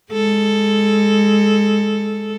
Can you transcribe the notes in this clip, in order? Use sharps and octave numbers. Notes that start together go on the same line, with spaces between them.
G#3 A4